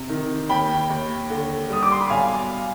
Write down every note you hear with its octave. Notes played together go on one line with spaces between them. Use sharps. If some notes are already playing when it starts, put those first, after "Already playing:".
Already playing: C3
D#3
D#2 G5 B5
D#2
D3
G3 D#6
D6
C6
B5
B1 F5 G#5